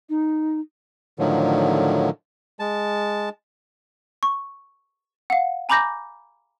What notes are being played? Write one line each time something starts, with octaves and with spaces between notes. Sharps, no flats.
D#4
A2 D3 D#3 F3 F#3
G#3 A5
C#6
F5 F#5
G#5 A#5 B5 D6 G6 A#6